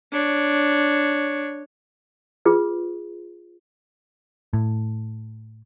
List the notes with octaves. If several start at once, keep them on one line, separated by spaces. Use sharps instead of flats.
D4 C#5
F4 G#4 B4
A2